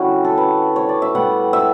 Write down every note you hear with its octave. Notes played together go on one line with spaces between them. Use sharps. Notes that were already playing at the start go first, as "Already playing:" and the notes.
Already playing: D3 G3 C#4 E4 F#4
A4
B4
C#5
D5
E5
A2 G3 B3 F#5
E5